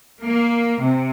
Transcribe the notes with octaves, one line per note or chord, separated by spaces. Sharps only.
A#3
C3